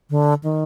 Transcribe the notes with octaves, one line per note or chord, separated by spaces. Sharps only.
D3
D#3